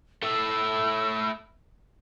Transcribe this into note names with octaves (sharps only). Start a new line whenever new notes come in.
A3 E4 E6